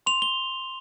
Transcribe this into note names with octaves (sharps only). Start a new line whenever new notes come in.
C6 F7
G7